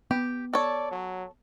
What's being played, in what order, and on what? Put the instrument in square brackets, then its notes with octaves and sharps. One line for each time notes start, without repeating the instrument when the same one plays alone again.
[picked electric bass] B3 [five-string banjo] G4
[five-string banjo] A4 C#5 [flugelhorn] D5
[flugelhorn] F#3